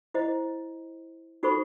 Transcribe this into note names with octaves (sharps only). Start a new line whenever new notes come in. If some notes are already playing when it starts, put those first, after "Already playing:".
E4 C5 D#5
D#4 F#4 A4 C5 B5 C#6